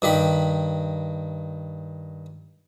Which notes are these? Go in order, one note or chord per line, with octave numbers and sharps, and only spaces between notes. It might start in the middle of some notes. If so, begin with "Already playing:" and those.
G2 D#3 G4 B5